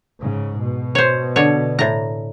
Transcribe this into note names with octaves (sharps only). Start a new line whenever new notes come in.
G#2 C#3
B2
C5 C#5
D3 C#5
A2 A#5